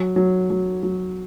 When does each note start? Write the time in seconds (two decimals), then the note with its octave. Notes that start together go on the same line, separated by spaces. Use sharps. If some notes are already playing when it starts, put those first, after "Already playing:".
Already playing: F#3
0.16 F#3
0.50 F#3
0.83 F#3